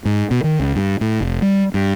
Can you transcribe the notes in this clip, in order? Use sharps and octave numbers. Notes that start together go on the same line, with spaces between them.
G#2
B2
D#3
C#2
G2
A2
F1
G3
G2